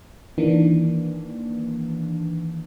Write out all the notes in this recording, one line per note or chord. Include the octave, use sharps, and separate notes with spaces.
D#3 E3 A#3 D4